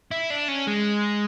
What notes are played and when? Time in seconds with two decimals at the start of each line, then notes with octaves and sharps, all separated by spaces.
0.11 E4
0.30 D4
0.49 C#4
0.67 G#3